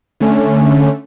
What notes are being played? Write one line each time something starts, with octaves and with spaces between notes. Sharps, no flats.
D3 A3 C#4